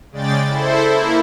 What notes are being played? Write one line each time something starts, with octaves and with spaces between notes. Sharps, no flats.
C#3 G#3 D5 G5 A6
E4 A4 C5
A#3 E4